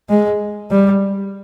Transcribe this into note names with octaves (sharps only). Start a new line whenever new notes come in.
G#3
G3